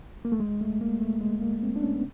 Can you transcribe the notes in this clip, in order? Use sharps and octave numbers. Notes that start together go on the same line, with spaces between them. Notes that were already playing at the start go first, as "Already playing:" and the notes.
A#3
A3
G#3
A3
A#3
A3
G#3
A#3
C4
D4
C#4
B3